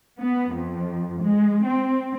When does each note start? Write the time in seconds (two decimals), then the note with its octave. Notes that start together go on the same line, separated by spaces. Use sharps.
0.18 B3
0.53 F2
1.20 G#3
1.63 C4